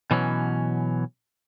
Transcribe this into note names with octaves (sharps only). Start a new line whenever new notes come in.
B2 E3 F#3 C#4